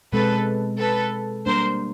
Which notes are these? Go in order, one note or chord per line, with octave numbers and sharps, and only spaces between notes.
B2 G#3 C4 A4 B4
A4 B4
G3 A#3 D4 A#4 C5